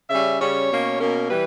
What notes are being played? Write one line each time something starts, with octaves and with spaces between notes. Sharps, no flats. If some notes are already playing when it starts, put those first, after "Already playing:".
C#3 G3 C#4 E5
C#3 G3 C#4 C#5
B2 A#3 C#4
B2 A#3 C#4 A#4
E3 G3 B4